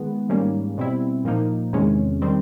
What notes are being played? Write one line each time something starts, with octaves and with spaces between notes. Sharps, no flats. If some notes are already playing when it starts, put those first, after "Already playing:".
Already playing: D#3 G#3 B3
G#2 D#3 G3 A#3 C#4
B2 G3 C4 E4
A#2 F3 A#3 D#4
E2 C3 D#3 G#3 C#4
D#3 G3 C4